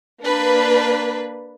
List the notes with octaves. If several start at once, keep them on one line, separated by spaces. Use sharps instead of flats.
A#3 D4 B4